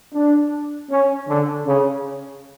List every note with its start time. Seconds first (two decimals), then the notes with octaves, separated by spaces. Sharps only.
0.13 D4
0.91 C#4
1.28 D3
1.67 C#3